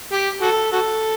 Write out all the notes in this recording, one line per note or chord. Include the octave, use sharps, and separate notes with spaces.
G4
F#4 A4
F#4 A4